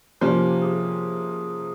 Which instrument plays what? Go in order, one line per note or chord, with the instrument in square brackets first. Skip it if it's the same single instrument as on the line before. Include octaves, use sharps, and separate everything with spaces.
[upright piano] C3 F3 A#3 C#4 [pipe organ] G4
[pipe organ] G#4